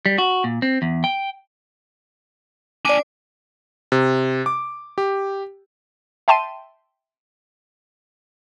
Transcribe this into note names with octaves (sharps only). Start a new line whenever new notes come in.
G3
F#4
A#2
C4
E2
G5
D4 D5 G#5 D6
C3
D6
G4
E5 G5 A5 C6 D#7